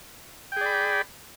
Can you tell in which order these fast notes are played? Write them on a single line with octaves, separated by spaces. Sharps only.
G5 G#4 D5 B5